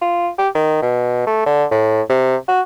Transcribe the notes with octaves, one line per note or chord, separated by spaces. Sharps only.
F4
G4
D#3
B2
A3
D3
A2
C3
F#4